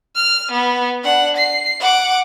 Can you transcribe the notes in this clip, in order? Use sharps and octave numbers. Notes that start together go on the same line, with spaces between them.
F6
B3
D4 F#5
C7
F#5 D6